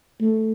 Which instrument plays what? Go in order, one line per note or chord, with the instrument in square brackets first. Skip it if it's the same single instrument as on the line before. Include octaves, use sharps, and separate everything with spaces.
[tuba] A3